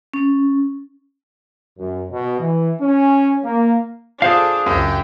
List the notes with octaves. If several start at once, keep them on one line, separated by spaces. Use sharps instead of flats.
C#4
F#2
B2
E3
C#4
A#3
D4 F4 G#4 A4 C5 F5
C#2 F#2 F4 G4